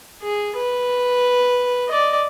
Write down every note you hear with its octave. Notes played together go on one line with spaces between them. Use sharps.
G#4
B4
D5 D#5